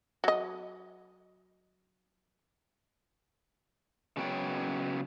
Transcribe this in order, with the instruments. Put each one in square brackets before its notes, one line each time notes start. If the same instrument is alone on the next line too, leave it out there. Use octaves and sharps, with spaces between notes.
[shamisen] F#3 D#5
[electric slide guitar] C#3 F#3 B3 C#4 G5